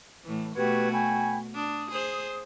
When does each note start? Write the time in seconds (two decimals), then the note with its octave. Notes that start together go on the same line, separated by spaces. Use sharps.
0.24 A2 E3
0.56 B2 A3 F#4 G4 B4 G#6
0.92 G5 G#5 B5
1.55 D4 D#6
1.92 G#4 C5